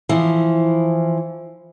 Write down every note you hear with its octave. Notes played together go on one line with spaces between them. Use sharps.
E3 F3